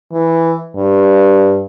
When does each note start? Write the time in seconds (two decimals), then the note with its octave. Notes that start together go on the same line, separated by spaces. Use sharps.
0.13 E3
0.76 G2